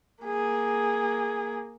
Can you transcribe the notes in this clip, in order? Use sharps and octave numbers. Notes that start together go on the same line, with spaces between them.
A#3 G#4